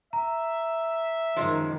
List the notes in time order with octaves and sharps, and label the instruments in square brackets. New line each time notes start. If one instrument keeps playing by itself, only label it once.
[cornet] E5 [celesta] A#5
[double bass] F#2 D#3 [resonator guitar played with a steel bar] F3 G#3